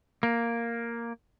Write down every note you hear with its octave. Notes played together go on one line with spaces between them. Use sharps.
A#3